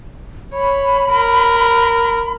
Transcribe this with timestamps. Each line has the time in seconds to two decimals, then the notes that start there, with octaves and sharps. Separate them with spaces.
0.54 C#5 B5
1.11 A#4